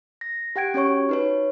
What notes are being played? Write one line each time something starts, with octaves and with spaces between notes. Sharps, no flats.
A#6
G4 F#5 G5 G#6 D7
C#4 G4 C#5 C#6
F#4
D#4 B4 C#5